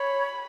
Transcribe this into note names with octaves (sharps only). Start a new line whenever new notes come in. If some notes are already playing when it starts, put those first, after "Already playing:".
Already playing: C#5 B5